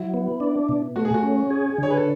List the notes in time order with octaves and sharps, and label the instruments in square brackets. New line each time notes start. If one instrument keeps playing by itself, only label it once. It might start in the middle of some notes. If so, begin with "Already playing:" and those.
Already playing: [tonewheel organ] F#3 [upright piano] E4
[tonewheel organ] B3
D4
B2
[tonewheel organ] A3 [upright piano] F#4
[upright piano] G#4
F#4
[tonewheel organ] C#4
G#4
[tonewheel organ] D3 [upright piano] C#5
[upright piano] B4
A4